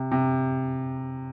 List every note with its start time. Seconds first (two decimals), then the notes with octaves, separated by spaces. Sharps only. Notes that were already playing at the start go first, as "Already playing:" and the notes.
Already playing: C3
0.11 C3